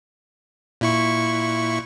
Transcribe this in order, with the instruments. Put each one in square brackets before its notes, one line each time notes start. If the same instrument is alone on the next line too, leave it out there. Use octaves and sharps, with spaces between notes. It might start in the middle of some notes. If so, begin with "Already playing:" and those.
[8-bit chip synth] A#2 E4 C#6